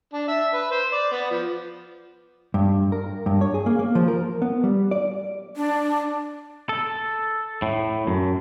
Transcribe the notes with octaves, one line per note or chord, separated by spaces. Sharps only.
D4
E5
B4
C5
D5
B3
F3
G2
A#4
G2
C#5
G#4
A#3
A#3
F3
A#4
B3
G3
D5
D4
A4
A2
F#2